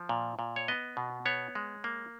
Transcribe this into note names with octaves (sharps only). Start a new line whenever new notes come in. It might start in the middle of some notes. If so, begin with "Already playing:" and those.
Already playing: F3
A#2
A#2
C#5
B3 D#5
B2
B3 C#5
G#3
A#3